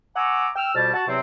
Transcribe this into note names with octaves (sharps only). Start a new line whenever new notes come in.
F#5 G#5 A#5 C#6 D6 E6
G5 E6 F6
F2 B2 G3 G4 A5
F#4 A5
E2 C3 F#3 C4